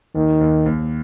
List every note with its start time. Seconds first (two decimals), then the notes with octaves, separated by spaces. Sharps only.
0.15 D#2 D#3
0.41 D#2
0.66 D#2